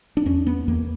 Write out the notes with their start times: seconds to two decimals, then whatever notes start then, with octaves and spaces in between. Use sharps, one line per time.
0.17 D4
0.26 E2 C#4
0.47 B3
0.68 E2 A#3